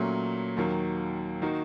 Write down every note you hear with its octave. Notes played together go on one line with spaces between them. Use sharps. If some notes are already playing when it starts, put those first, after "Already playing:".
Already playing: A#2 F#3 A3 C#4
D#2 D#3 F#3 A#3
D#3 A#3 D#4 F#4